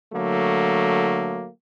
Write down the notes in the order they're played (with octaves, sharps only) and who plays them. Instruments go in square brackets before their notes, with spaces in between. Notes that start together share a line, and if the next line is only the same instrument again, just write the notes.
[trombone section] D3 F#3 A3 A#3